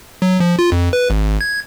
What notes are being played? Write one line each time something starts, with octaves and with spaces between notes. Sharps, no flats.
F#3
F3
F4
F2
B4
G#1
G#6